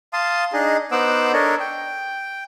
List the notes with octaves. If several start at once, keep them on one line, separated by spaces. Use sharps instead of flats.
F5 A5 C6 D#6
D4 D#4 G#4 D#5
B3 D#4 C5 F#5 D6 E6
D4 A4 A#4 C#5 D#5
G5